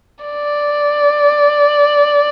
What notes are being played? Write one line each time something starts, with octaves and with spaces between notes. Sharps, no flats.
D5